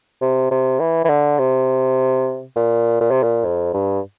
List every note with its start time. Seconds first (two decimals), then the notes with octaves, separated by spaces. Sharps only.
0.21 C3
0.51 C3
0.80 E3
1.04 E3
1.09 D3
1.39 C3
2.56 A#2
3.01 A#2
3.11 C3
3.23 A#2
3.44 F2
3.74 G2